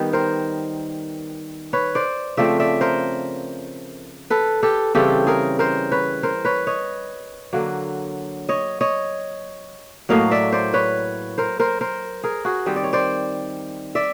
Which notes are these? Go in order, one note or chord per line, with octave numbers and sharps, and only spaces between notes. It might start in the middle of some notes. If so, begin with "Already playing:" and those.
Already playing: D#3 G3 B3
A#4 C5
B4 C#5
C5 D5
C#3 F3 A3 C4 D5 E5
D5 E5
A#4 C5
A4 B4
G4 A4
C#3 E3 G3 C4 G4 A4
G#4 A#4
A#4 C5
B4 C#5
A#4 C5
B4 C#5
C#5 D#5
D3 F#3 A#3
C#5 D#5
C#5 D#5
A2 F#3 A#3 D#5 F5
D5 E5
C5 D5
B4 C#5
A#4 C5
A#4 C5
A#4 C5
G#4 A#4
F#4 G#4
D#3 G3 C4 D#5
D5
C#5
C5 D5
D5 E5